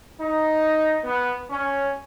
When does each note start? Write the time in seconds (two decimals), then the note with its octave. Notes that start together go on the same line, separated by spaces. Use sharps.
0.20 D#4
1.04 B3
1.50 C#4